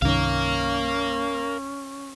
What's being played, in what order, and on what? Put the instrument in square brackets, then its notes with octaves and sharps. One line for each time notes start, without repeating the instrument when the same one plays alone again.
[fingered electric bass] C2 G2 D#3 [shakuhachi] C#4 [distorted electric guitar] A#4 F5